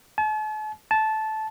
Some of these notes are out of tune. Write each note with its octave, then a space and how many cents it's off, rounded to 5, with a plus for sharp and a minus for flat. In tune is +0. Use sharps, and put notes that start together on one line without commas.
A5 -45
A5 -15